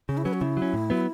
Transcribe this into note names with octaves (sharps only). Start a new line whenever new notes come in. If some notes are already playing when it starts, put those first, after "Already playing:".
C#3 C#4
E4
F#3 C#4 B4
F#4
C#3 E4
F#3
C#4
A2
F#3 B3